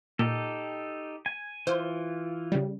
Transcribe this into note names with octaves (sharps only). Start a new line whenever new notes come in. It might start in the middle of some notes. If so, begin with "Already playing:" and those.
A#2 D#4 G4 A4
G#5
E3 F4 C5
C#3 G3